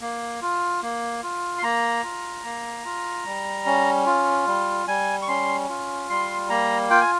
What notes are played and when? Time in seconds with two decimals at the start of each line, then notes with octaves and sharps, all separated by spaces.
0.01 A#3
0.42 F4
0.82 A#3
1.23 F4
1.58 C6
1.63 A#3 A#5
2.04 F4
2.45 A#3
2.85 F4
3.26 G3
3.66 C#4
4.06 F4
4.47 G3
4.87 G3 G#5
5.22 C#6
5.28 C#4 C6
5.69 F4
6.09 G3 C6
6.49 A#3 A#5
6.90 F4 G5
7.01 G#5